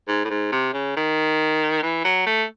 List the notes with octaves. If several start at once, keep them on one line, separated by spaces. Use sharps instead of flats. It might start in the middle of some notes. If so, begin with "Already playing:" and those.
G#2
A2
G#2
C3
C#3
D#3
E3
F#3
A3